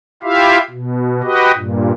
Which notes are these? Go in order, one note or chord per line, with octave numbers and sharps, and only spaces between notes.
E4 F4 G4 E5 F5
B2
F#4 G4 B4 D#5
G2 A#2